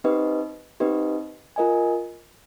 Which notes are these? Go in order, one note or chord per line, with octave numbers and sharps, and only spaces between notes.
C4 D#4 G4 B4 D#5
C4 D#4 G4 B4 D#5
F4 A#4 D#5 G#5